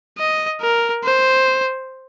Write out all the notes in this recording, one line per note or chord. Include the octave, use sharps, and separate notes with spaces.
D#5
A#4
C5